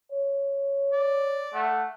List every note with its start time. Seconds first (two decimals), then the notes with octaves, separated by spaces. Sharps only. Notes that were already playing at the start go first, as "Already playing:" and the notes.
0.11 C#5
0.93 D5
1.54 A3 F#5